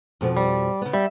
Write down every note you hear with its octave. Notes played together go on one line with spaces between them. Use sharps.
F2 B2 F3
G3
C#3 B3
G3 E5